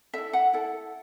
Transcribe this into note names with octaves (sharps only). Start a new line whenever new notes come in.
E4 A4 E5
F#5
E4 A4